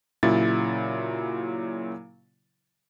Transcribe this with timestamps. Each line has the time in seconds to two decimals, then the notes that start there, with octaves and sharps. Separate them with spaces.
0.23 A#2 C#3 F#3 E4 A6